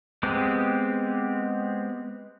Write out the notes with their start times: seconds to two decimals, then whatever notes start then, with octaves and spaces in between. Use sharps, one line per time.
0.23 G#3 B3 C4 G4